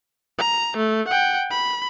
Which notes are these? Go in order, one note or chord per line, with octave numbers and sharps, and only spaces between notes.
A#5
A3
F#5 G5
B5